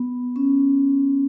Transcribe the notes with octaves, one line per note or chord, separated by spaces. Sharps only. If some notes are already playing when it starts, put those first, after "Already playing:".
Already playing: B3
C#4